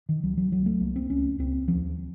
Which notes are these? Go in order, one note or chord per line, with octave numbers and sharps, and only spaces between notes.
D#3
C#2 F#3
F#3
C2 F#3
A3
C2 A#3
C4
C#2 C#4
C#2 C4
D#2 F3